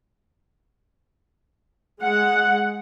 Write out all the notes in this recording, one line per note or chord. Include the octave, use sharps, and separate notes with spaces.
G#3 F#5